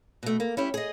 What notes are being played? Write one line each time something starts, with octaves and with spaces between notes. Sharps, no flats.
B2 A3
A#3
C#4 E4 G4
G#4 D#5